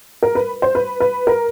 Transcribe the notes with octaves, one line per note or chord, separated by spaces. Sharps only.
A#4
B4
C5
B4
B4
A#4